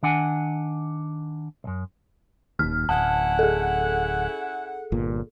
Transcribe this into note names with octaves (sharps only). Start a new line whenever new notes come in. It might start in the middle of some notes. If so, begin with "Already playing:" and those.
D#3 D4 F#5 G#5
B1 F#2
D#1 D#2 F6
D1 C#4 E4 F#5 A5
G#4 A4
G1 A#2